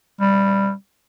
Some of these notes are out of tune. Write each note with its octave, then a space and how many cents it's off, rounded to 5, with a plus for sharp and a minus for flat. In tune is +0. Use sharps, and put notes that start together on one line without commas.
G3 +10